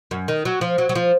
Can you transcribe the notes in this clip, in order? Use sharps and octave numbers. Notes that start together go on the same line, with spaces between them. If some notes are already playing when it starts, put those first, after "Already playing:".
F#2
D#3
F#3
F3
F#3
F#3
F3